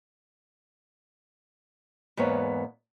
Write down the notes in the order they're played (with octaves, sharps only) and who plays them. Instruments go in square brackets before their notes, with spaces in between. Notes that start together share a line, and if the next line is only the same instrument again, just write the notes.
[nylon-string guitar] E2 G#2 A#3 B3 C#5